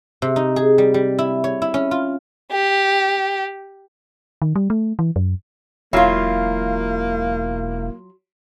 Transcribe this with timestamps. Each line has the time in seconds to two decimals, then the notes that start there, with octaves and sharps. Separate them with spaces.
0.22 C3
0.36 D#4
0.56 G#4
0.78 G3
0.94 G3
1.18 E4
1.44 C#5
1.62 E4
1.74 C#4
1.91 F4
2.52 G4
4.42 D#3
4.56 G3
4.70 A3
4.99 E3
5.16 F#2
5.93 E1 F#3 A#3 E4 F4 F5